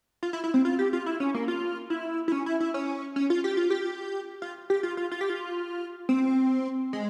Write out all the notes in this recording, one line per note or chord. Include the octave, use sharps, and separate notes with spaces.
F4
E4
E4
C4
F4
G4
F4
E4
C#4
A#3
F4
E4
E4
C#4
E4
E4
C#4
C#4
F4
G4
F4
G4
F4
G4
F4
F4
F4
G4
F4
C4
G#3